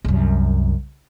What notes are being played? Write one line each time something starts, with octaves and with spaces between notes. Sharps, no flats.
C2 F#2